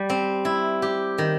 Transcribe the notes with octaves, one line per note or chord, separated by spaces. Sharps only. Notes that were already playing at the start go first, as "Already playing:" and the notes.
Already playing: G3 G4
C4
E4
G4
D#3